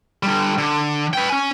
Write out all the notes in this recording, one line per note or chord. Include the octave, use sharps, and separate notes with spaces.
D3 G3
D3
B4 G5
C#4 G#5